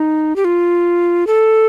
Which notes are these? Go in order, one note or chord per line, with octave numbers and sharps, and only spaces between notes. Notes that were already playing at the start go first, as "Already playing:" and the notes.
Already playing: D#4
G4
F4
A4